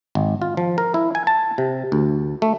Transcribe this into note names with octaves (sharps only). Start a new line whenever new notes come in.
G#1
F4
F3
A#4
E4
G#5
A5
C3
D2
A3